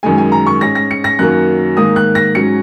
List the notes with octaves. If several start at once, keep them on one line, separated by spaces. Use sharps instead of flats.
F#2 D#3 G#3 G#5
G#5
A#5
C#6
G#2 G#3 C#4 A#6
A#6
C#7
A#6
F#2 D#3 F#3 A#3 F#6
G#2 D#3 A#3 D#6
F#6
A#6
G#2 F#3 C#4 C#7